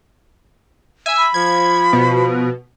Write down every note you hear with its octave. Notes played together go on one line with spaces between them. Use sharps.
E5 G#5
B5
F3 G#6
B2